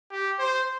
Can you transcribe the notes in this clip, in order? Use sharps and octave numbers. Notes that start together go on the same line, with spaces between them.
G4
C5